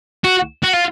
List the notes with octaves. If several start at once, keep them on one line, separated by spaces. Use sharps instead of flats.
F#4
F#4
F4